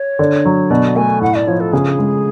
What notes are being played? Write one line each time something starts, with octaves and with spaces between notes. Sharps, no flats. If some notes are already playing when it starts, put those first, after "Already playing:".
Already playing: C#5
D3
F#3
B2 D5
A3 G#5
A2 F#5
D5
F3 C#5
A4
C#3 G#4
G#3